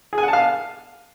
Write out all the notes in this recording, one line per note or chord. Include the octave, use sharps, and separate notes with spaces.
G#4
G#5
F#5
A5
F5